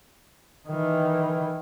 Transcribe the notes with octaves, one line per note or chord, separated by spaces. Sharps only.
D#3 E3